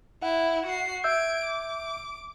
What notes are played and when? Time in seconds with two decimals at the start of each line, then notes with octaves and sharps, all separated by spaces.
0.22 E4 F#5
0.66 F#4 C7
1.04 E5 E6 G6 G#6 D7
1.46 D6